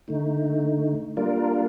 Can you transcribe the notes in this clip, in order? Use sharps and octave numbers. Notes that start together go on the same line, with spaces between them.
D3 A3 D#4
G3 A#3 D4 F4 A#4